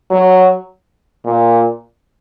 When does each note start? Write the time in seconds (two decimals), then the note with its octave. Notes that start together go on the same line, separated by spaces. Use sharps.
0.11 F#3
1.25 A#2